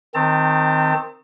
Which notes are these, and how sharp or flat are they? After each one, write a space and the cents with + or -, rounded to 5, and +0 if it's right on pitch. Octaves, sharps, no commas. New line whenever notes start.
D#3 +0 C4 +0 A5 +35